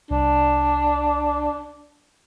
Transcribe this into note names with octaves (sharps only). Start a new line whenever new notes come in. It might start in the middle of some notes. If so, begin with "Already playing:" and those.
C2 D4